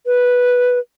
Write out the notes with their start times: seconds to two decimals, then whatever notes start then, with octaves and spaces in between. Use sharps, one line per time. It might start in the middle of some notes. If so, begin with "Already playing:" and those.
0.06 B4